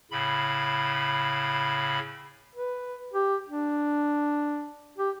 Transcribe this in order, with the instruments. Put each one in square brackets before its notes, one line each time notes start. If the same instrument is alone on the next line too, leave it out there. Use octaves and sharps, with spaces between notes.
[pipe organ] A2 C#3 B5
[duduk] B4
G4
D4
G4